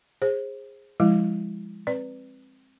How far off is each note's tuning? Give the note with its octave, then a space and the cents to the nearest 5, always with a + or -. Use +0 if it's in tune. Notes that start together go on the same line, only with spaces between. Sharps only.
G#4 -15 C5 +30
F3 +0 G#3 -15 E4 +0
C4 +15 B4 +5 D5 +0